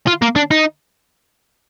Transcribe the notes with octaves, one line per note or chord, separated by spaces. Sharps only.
F4
A#3
D4
D#4